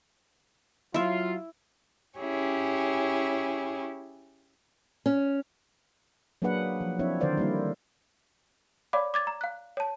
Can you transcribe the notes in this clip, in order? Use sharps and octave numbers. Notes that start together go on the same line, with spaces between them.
F#3 E4 F4 E5
C#4 E4 G4 G#4 C#5
C#4
F#3 A#3 D4 G#4 B4 F#5
F3
F3 C4 D4 E4 C#5 E5
D3 D#3 A#4 C5 D5 F5
G3 A#3 E4
C#5 D5 F5 B5 D6
D6 G#6 A6
A#5
F5 F#6
C#5 A5